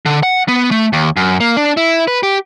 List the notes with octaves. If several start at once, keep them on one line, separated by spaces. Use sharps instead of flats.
D3
F#5
B3
A3
D#2
F#2
A#3
D4
E4
B4
G4